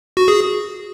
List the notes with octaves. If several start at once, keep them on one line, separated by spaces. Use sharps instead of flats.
F#4
G#4